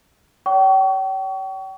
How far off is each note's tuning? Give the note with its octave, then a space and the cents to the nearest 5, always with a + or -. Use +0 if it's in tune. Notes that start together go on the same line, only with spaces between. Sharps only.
C#5 +40 G5 -40 C#6 +30